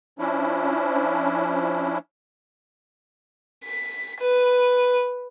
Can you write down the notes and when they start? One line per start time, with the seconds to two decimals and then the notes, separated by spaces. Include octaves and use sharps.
0.19 F3 C#4 D4 E4
3.65 B6
4.20 B4